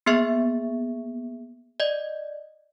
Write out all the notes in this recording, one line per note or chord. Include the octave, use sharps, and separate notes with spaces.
A#3 B3 G#4 E5 C#6
D5 D#5